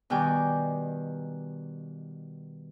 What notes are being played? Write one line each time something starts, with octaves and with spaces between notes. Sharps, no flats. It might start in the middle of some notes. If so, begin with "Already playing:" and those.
B2 D#3 G3 G5 G#5 D6